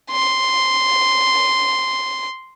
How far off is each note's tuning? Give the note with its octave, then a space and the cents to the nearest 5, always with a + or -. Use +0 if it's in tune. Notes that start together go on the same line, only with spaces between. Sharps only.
C6 -5